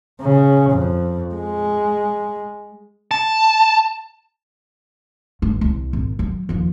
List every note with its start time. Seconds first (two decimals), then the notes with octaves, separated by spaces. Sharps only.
0.21 C#3
0.72 F2
1.35 G#3
3.11 A5
5.42 D2 G2
5.61 C2
5.93 G#1
6.19 F#3
6.49 D#2 F3